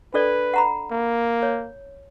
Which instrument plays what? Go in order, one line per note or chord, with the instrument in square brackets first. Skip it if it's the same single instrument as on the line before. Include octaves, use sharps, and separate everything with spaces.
[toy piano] D4 A4 D5 [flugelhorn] B4
[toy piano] F#5 A#5 B5
[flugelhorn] A#3
[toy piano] C#5